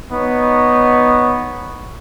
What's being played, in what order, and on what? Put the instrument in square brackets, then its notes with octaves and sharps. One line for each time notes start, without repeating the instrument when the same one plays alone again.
[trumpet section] B3 D#4 C#5